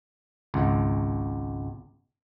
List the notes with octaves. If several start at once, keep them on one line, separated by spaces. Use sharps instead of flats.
G#1 C#2